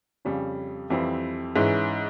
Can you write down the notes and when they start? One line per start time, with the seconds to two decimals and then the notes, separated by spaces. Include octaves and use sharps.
0.25 F2 C#3 G3 C#4
0.90 F2 E3 G3 C4 E4
1.56 G#2 E3 G#3 C#4 E4